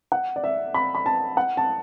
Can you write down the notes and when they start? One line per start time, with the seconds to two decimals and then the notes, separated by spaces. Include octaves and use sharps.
0.12 F#5
0.36 D5
0.44 E5
0.74 B5
0.95 B5
1.06 A5
1.37 F#5
1.57 A5